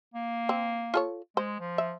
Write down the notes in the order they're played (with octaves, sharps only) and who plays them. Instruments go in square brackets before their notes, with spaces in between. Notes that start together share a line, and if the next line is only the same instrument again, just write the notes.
[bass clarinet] A#3
[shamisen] C4
F4 A4 C#5
[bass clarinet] G#3 [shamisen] C5
[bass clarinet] F3
[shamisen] E5